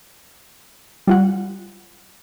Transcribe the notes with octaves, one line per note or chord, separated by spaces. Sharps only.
G3 F4 F#5